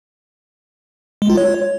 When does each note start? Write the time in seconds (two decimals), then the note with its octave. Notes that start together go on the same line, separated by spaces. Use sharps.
1.22 G#3
1.30 F4
1.37 C#5